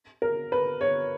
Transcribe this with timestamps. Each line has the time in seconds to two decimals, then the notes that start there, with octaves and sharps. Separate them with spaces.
0.22 A#4
0.52 B4
0.81 C#5